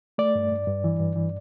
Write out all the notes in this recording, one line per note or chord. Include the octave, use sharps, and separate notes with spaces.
A3 D5
G2
G2
G2
E3
G2
E3